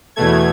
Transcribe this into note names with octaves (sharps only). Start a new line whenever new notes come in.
E2 B2 A3 G#6